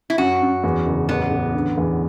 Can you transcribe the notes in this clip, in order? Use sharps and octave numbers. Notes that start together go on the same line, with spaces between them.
E4
F#2 F#4
F#2
E2
F#1
A1 B3
A1
D3
E2